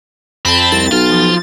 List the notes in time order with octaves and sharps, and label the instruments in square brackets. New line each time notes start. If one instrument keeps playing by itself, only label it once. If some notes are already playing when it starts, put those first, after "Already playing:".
[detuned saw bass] F2 [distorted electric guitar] C4 [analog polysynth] A5 B5
[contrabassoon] C2 [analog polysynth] A6
[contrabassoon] B1 [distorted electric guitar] F4
[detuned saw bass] F3